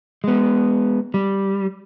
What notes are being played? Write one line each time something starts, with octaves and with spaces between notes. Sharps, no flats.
G#3 B3
G3